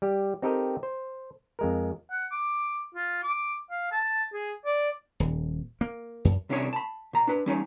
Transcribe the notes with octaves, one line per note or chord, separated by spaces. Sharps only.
G3 G4
C4 D#4 G4 A4 A#4 D#5
C5
F2 G#3 A#4
F#5
D6
F4
D6
F5
A5
G#4
D5
D#1
A#3
F#2
C2 C3 C#4 D4 E4 C#5
A5 B5
A#2 A#5
D4 B4
G3 C#4 D#4 C#5